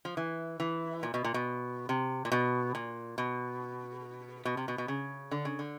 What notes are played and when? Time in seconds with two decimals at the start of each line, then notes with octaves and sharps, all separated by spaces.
0.05 F3
0.17 E3
0.60 E3
1.03 A#2
1.14 B2
1.24 A#2
1.34 B2
1.89 C3
2.25 A#2
2.32 B2
2.75 A#2
3.18 B2
4.45 B2
4.57 C3
4.68 B2
4.78 B2
4.88 C#3
5.31 D3
5.45 C#3
5.59 D3